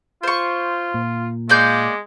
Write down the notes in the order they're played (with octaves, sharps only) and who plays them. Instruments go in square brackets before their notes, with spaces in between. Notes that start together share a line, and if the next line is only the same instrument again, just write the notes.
[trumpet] F4 [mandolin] C5 C#6
[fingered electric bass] A#2
[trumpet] G#3 [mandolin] A#3 D5 G6